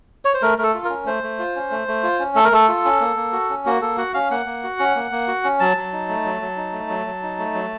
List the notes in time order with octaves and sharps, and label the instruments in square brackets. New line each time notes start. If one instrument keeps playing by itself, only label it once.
[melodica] C#5
C5
A3 A#4
A3 A4 A#4
F4
A#4
C#4
A3 C5
A3
F4
C#4
A3
A3
F4
C#4
A3 A4
A#4
A3 A4
F4
C#4
A#3
A#3
F#4
C#4
A#3 F#4
A#3 A4
F#4 F#5
C#4 F5
A#3 F#5
A#3
F#4
C#4
A#3
A#3
F#4
C#4
F#3 A5
F#3
D#4
A3
F#3
F#3
D#4
A3
F#3
F#3
D#4
A3
F#3